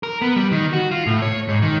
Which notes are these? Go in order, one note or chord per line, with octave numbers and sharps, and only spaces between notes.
A#4
B3
G3
D#3
F#4
F4
A2
C#5
G#2
D#3